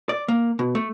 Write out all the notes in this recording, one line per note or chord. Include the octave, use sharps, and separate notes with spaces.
D5
A#3
B2
A3